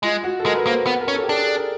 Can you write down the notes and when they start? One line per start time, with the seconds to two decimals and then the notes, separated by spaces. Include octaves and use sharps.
0.03 G#3 F4
0.24 F#4
0.40 A4
0.46 G#3 A#4
0.55 B4
0.66 A#3 C5
0.86 B3 B4
1.01 A#4
1.08 C#4
1.14 A4
1.23 G4
1.28 D4 G#4
1.43 A4
1.57 A#4